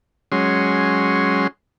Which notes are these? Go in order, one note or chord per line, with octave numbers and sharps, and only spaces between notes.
F#3 G#3 C#4 C6